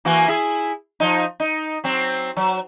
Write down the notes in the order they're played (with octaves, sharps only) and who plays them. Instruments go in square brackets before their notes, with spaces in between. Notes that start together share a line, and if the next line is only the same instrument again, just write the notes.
[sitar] E3 A#3 F#4
E4 G#4
F3 D#4
D#4
F#3 C4
F#3